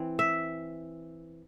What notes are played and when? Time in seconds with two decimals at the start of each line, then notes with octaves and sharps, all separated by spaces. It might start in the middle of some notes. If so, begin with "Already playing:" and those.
Already playing: E3 C4
0.19 E5